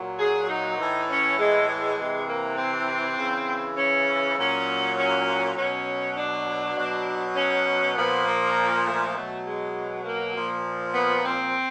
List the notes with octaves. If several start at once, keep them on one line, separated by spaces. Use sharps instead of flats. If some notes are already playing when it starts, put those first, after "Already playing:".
Already playing: A#2 F#3
G#4
D#4
A2 E3
C#4
G#3
G#3
C3 E3
A#3
C4
C#3 E3
C#4
A#2 F#3 C#4
C#4
B2 F#3 C#4
D4
B2 F#3
C#4
A#2 F3 B3
A#3
A3
B2 F#3
G#3
A#3
A#2 F3
B3
C4